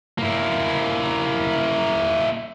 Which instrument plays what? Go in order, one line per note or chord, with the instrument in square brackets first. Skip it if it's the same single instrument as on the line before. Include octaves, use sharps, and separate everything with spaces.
[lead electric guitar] A#3 E4